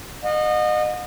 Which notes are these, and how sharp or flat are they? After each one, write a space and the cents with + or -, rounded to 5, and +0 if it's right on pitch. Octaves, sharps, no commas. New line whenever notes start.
D#5 -25 F#5 -45